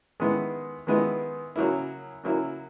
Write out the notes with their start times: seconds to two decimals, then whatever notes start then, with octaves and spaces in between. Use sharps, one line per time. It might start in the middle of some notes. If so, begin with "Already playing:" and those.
0.20 D#3 G#3 B3 E4
0.87 D#3 G#3 B3 E4
1.56 C#3 F#3 A#3 E4
2.23 C#3 F#3 A#3 E4